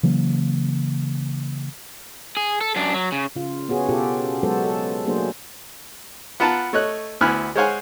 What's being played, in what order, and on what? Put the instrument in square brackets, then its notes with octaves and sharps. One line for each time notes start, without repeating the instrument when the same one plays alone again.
[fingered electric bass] C#3 E3 F#3 A#3
[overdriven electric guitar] G#4
A4
F#2 D4
F#3
C#3
[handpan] C#3 F4
B3 C#4 F#4 G#4
B2 F4 G4 A4
F#3 G#3 B3 F#4 A4 C5
A4
F#3 A3 A#3 D4 G#4 C5
[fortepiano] B3 F4 F#5 A5 A#5
A3 C#5 D#5 F#6
D2 B3 E4 G#5 F6 F#6
G#3 C5 C#5 F5 F#5 G#5